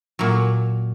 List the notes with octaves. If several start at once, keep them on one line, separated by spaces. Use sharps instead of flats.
A#2 F#3